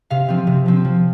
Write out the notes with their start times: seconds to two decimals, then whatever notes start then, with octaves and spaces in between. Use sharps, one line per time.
0.10 C3 F5
0.28 F3 C4
0.47 C3
0.66 F3 C4
0.85 F3